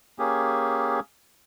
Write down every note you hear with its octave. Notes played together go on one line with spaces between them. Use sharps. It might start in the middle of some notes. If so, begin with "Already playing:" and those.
A#3 C#4 G4 G#4